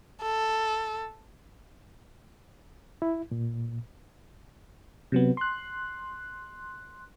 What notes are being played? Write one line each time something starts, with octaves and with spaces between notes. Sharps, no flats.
A4
E4
A#2
C3 F#3 B3
C6 F#6